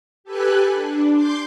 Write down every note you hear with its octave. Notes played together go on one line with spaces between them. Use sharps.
G4 A4 B4 G#5 F#6
D4
C6 D6 G6